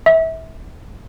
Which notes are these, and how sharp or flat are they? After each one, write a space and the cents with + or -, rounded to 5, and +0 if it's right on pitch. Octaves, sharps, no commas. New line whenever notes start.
E5 -25